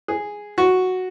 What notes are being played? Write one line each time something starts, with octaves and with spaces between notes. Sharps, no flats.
G#4
F#4